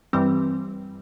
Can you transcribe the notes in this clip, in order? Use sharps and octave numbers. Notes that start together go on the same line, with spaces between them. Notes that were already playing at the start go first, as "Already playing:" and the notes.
G2 E3 G3 C4